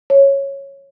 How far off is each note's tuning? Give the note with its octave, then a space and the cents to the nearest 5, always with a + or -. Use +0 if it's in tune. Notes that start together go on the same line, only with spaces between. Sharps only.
C#5 -10